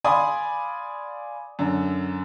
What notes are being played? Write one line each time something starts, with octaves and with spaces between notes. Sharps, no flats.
D5 F5 G#5 B5 C6 D#6
F#2 D3